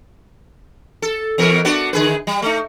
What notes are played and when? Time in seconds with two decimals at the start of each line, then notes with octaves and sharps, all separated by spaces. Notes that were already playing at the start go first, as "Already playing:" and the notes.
1.02 A4
1.38 E2 B2 A#4
1.65 B3 D4 F#4
1.93 D3 G#4 B4
2.27 G3
2.42 A3 D#4